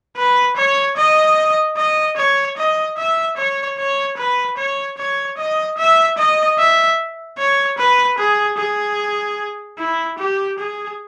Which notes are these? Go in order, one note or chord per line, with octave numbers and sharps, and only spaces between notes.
B4
C#5
D#5
D#5
C#5
D#5
E5
C#5
C#5
B4
C#5
C#5
D#5
E5
D#5
E5
C#5
B4
G#4
G#4
E4
G4
G#4